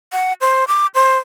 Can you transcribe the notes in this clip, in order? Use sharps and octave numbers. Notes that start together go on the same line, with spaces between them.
F#5
C5
D6
C5